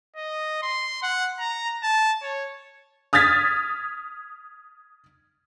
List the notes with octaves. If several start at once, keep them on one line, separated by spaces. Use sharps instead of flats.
D#5
C6
F#5
A#5
A5
C#5
D#6 F6 G#6 A6 B6